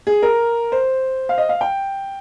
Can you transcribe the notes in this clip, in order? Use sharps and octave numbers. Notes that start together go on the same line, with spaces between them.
G#4
A#4
C5
F5
D#5
F5
G5